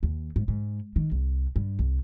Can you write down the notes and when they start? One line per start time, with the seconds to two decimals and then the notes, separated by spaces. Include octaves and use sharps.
0.03 D#2
0.36 G#2
0.48 G#2
0.96 D#3
1.11 C2
1.56 G2
1.79 C2